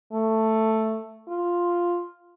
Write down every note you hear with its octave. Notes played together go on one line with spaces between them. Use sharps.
A3
F4